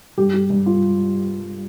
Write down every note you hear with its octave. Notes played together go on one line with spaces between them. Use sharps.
G2 G4
G4
G2
F4